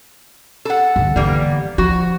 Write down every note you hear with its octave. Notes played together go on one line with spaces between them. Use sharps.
A4 F#5
G2 D3
D3 E3 G3 A#3 B3
F3 F#4